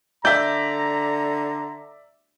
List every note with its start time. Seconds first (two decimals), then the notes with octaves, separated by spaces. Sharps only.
0.25 D3 D5 E5 A#5 G6